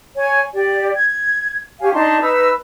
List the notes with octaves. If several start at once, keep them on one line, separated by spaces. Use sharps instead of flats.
C#5 G#5
G4 D5
G#6
G4 C#5 F5 G#5
D4 D#4 A5 C6
D#4 B4 E6